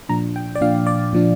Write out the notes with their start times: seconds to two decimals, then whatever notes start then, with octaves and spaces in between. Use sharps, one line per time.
0.09 A#2 F3 D4 A#5
0.36 G5
0.55 D5
0.61 A#2 F3 D4 F5
0.87 D5
1.13 A#2 F3 D4